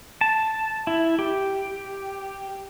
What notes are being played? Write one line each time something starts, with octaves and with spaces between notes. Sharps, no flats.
A5
E4
G4